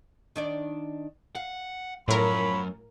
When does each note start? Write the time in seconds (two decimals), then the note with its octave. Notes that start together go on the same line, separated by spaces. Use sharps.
0.36 D#3 D4 D5
1.35 F5 F#5
2.08 F#2 A2 F3 A#4 C#5 B5